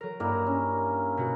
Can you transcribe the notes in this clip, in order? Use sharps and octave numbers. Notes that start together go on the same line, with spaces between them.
F#3 A#4
G2 A#3 E4
C#4
B2 F#4